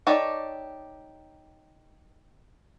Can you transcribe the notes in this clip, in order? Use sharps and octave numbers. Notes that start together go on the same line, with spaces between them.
D#4 G4 A4 C#5 D5